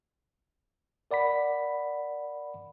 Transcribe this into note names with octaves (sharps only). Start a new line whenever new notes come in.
A#4 D5 F#5 B5 B6